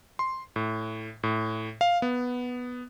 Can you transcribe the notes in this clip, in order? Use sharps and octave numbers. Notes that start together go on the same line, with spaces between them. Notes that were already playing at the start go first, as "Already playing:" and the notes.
C6
A2
A2
F5
B3